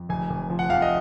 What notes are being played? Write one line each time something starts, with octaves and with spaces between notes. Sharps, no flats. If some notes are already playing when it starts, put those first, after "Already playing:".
Already playing: F2
F1 G#5
F1
F3
F#5
F2 F5
D#5